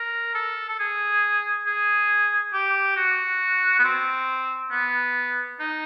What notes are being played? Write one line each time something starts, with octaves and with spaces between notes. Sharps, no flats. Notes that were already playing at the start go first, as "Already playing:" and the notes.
Already playing: A#4
A4
A4
G#4
G#4
G4
F#4
B3
C4
B3
D#4